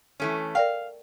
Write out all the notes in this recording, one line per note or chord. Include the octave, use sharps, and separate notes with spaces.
E3 A3 C#4
A#4 D5 F5 G5